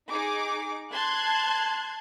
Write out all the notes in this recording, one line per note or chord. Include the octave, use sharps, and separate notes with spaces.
D#4 G#4 D6
A5 C6 F#6 G#6